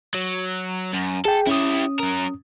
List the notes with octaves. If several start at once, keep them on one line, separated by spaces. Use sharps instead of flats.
F#3
F#2
G#4 A4 G5
C#4 E4 G4 D#6
F#3 A#4